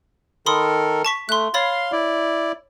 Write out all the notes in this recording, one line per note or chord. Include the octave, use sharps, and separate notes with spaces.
D#3 A4 A#4 B5 C6 D#6
A5 C#6 B6
A3 C6 F#6
C#5 F5 B5 C6 A6
E4 D5